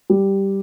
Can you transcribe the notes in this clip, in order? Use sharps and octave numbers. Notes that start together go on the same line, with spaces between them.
G3